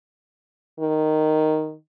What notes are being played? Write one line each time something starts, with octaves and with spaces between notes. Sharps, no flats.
D#3